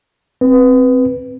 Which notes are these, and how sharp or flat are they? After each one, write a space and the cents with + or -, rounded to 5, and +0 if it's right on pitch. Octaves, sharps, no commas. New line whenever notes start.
C4 +0 B4 +0